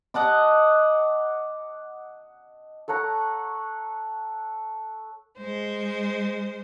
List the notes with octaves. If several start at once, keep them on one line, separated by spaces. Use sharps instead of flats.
D#5 F#5 A5 D6
A4 C#5 F#5 A#5
G#3 C5